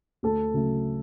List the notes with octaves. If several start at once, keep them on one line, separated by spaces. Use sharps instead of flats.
D2 A4
C#3 F#3 A3